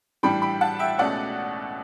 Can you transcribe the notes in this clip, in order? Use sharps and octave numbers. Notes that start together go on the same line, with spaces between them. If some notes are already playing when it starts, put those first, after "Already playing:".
A2 E3 G3 D4 G5 B5
G5 B5
F#5 A5
E5 G5
C#2 B2 A3 C#4 D5 F#5